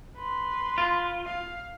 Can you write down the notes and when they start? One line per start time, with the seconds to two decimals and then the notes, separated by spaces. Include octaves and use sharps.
0.18 B4 C6
0.78 F4
1.24 F5